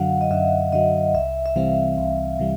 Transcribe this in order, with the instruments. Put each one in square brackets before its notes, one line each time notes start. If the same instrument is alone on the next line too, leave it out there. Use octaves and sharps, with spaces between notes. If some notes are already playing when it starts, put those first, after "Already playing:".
Already playing: [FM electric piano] F#2 D3 F#3 [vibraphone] F5 F#5
[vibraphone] D#5
[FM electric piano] F#2 [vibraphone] E5
[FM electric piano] D3 F#3 [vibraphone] D#5
[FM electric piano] C2 [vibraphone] E5
[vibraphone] E5
[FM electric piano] C3 E3 G3 C4 [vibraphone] F5
[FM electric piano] C2
C3 E3 G3